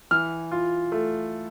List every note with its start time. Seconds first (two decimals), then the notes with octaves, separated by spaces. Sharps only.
0.11 E3 F6
0.52 F4
0.92 A3